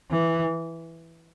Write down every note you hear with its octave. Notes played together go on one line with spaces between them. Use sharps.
E3